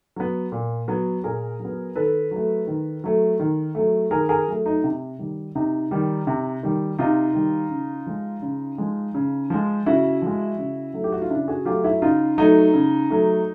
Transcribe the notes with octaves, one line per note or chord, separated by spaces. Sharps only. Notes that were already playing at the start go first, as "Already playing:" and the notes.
F#3 B3
A#2
F#3 B3
A#2 G#4 A#4
F#3
B3
D#3 A4 B4
F#3 A3
D#3
F#3 A3
D#3
F#3 A3
D#3 G#4 A#4
G#4 A#4
F#3 A3
D#4
C3
D#3 G3
C3 D#4
D#3 G3
C3
D#3 G3
C3 D#4 F4
D#3 G3
C#3
F3 G#3
C#3
F3 G#3
C#3
F3 G#3
C#3 E4 F#4
F3 G#3
C#3
F#3 A3
G4
F#4
F4
C#3 D4 E4
F#4 G#4
F#3 A3 F4 G4
E4 F#4
C#3 D#4 F4
F#3 A3 D#4
C#3
F#3 A3